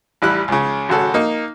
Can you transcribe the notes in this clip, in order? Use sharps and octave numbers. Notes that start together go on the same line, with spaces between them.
A1 G3 E4 F#6
C#2 C#3
G#1 C#3 F#4 A4
A#3 D#4